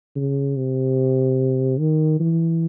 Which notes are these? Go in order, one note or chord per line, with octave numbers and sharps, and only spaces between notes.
C#3
C3
D#3
E3